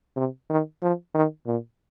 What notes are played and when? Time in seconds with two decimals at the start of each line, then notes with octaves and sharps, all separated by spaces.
0.17 C3
0.50 D#3
0.82 F3
1.14 D#3
1.47 A#2